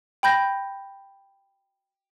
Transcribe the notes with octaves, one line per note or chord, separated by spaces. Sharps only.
G5 B5 G6 A#6